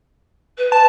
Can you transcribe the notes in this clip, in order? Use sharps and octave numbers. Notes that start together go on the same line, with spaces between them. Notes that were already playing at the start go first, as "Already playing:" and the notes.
B4
A5